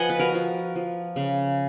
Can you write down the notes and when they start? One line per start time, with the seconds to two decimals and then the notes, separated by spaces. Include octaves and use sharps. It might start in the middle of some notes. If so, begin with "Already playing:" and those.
Already playing: F3 B3 D#5 F#5 G#5
0.10 B4
0.19 F#4 A#4
0.34 F3
0.76 F3
1.16 C#3